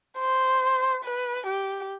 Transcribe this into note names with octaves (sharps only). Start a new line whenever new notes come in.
C5
B4
G4